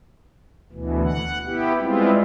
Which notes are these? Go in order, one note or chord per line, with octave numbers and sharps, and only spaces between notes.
D2 B2 E3
F#5
B3 E4 G4
G3 G#3 B3 C4 E4 F4